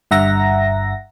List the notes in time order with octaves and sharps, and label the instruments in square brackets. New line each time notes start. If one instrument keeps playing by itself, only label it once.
[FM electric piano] G1 G2 E5 F#5 A#5 A#6